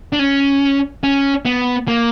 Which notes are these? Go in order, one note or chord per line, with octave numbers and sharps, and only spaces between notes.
D4
C#4
C#4
B3
A#3